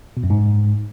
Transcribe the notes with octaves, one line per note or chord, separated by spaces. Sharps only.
B2
F#2
G#2